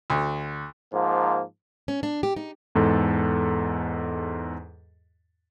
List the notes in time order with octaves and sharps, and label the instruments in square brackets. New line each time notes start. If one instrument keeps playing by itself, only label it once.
[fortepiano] D2
[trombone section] G#2 F3 A#3
[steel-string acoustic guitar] C#4
D4
G4
D#4
[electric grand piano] E2 G#2 A4